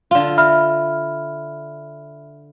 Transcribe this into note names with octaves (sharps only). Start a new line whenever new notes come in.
D3 F4
E5 B5 F6